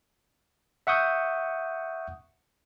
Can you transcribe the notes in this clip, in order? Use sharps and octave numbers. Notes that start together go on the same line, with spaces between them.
E5 F#5 C#6 D#6 G6